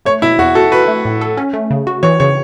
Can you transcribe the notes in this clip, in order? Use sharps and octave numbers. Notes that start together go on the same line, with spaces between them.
A3 C#5
B2 E4
E2 F#4
F#4 A4
F#4 B4
A3
A2
A4
C#4
A3
C#3
F#4
E3 C#5
C#3 C#5